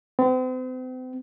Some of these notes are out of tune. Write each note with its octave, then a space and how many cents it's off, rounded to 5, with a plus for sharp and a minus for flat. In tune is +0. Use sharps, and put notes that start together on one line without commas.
C4 -40